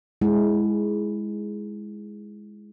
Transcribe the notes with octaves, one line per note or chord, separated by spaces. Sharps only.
G#3 E4